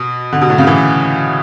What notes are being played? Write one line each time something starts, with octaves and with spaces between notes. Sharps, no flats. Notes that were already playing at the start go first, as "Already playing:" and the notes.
Already playing: B2
D3
B2
A2
C#3
E3